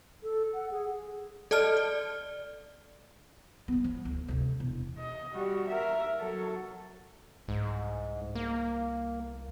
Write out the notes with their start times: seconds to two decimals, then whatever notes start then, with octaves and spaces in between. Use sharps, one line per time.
0.23 A4
0.54 F#5
0.71 G#4
1.51 A4 D5 D#5 A5 F6
1.77 D5
3.68 F#3 B3
3.84 F3
4.05 D2
4.28 D2 C3
4.60 E1
4.98 D#5
5.34 G3 F#4
5.68 A#4 E5
6.20 F#3 A4
7.48 C2 G#2
8.35 A#3